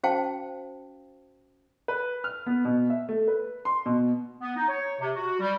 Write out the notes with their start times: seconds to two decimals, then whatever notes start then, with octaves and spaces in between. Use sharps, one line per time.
0.03 C#4 F#4 C5 F5 G5 A5
1.88 B4
2.24 F6
2.46 B3
2.65 B2
2.90 E5
3.09 A3
3.28 B4
3.65 C6
3.86 B2
4.41 B3
4.56 D#4
4.69 C#5
5.00 C3
5.15 F#4
5.40 G3